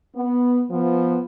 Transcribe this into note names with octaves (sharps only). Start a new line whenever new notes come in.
B3
F3 B3